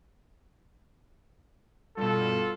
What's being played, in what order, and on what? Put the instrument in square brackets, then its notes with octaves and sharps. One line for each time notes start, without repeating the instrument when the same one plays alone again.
[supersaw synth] G2 B2 [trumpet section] F4 A4